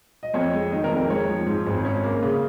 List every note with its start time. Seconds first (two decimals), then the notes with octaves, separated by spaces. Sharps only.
0.23 D#5
0.34 F2 C#5
0.53 G#3
0.72 D#3 D#5
0.84 A#4
0.91 F2
0.97 A#4
1.10 G#3 C#5
1.29 F3
1.47 G#2
1.67 G#1
1.85 C#4
2.03 A#3
2.23 C#3